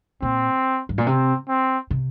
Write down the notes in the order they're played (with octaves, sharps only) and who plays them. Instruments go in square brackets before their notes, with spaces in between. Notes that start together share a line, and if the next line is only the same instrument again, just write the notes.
[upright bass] A#2 [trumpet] C4
[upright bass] G2
A#2
[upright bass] C3 [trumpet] C4
[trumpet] C4
[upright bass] C3